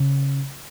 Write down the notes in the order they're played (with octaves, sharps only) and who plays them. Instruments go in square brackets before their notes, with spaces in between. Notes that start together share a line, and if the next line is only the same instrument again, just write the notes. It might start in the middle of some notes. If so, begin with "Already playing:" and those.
Already playing: [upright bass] C#3